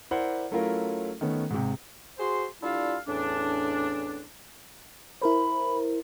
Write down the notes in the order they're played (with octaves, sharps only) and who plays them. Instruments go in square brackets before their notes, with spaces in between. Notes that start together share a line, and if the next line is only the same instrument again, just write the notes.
[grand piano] E4 A#4 C5 D5 F#5
F#3 A3 C#4 E4 F4 A#4
D#3 A3 B3 C#4
G#2 C3
[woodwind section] F#4 G#4 C5 C6
G3 D4 E4 F4 A4 F5
E2 A2 C#4 D4
[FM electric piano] E4 A#4 C5 [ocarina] B5